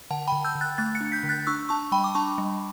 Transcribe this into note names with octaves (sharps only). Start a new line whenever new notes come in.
D3 F#5 A5
D3 G5 B5
E6 G6
D3
F#6 A6
A3 F#6 A6
A6 C#7
D4
G6 B6
D3
F#6 A6
D4 C#6 E6
D4 A5 C#6
G3 G5 B5
D6
D4 A5 C#6
G3